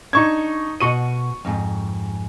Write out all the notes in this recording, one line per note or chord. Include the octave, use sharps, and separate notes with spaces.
D4 D#4 C#6 G#6
B2 F#4 D#5 C#6 D#7
F2 G#2